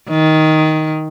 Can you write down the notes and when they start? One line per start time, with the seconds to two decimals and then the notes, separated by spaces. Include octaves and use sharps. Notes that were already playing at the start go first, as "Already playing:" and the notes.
0.09 D#3